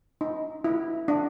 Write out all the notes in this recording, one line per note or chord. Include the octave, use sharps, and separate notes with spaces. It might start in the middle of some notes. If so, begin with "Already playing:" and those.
D#4
E4
D4